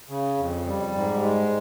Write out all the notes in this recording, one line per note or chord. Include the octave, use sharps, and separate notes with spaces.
C#3
F2
G3
G#2
G#3